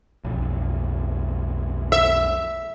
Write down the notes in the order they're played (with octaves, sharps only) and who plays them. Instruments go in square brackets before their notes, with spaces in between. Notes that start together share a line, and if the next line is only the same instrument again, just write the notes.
[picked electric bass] B1 F2
[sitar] E5